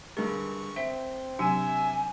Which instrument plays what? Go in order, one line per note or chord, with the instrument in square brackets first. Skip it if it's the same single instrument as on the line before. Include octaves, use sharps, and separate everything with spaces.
[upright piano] G2 D3 G#3 [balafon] A#4 [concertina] C#6
[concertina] C4 [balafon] E5 [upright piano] B6
[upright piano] C3 D#7 [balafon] F#3 D4 [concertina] E5 E6 [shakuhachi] G#5